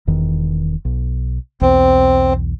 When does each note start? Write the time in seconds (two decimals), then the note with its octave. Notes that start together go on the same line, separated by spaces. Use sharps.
0.07 E1 E2 D#3
0.85 B1
1.61 B1 E2 C4